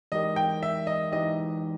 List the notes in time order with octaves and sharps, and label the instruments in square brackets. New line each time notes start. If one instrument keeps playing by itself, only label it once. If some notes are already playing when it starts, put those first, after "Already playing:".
[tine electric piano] E3 G#3 D#4 G4 A#4 [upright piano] D#5
[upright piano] G5
E5
D#5
[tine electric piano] E3 G#3 D#4 G4 [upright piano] D#5